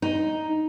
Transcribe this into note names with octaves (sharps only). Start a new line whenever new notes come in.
D#4